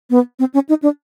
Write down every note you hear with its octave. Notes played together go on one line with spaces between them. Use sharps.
B3
C4
C#4
D#4
D4